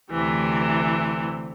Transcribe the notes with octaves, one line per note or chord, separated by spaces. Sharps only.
D2 C3 E3